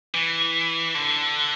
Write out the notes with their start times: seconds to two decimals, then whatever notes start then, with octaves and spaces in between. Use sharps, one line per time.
0.15 E3
0.95 D3